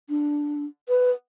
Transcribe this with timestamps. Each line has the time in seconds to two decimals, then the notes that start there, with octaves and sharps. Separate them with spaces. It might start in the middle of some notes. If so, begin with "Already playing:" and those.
0.09 D4
0.89 B4